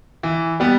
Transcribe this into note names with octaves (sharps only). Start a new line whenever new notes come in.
E3
G3 B3